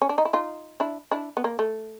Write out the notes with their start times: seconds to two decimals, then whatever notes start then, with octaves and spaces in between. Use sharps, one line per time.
0.02 C#4
0.09 D4
0.18 D#4
0.25 E4
0.33 D#4 F4
0.80 D4 E4
1.11 D4 E4
1.37 B3
1.44 A#3
1.59 A3